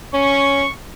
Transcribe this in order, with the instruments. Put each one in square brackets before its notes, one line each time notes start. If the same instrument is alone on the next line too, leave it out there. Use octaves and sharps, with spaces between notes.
[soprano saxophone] C#4 [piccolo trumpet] C#6